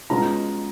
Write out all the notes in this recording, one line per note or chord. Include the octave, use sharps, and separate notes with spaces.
B2 G#3 C#4 F4 A#5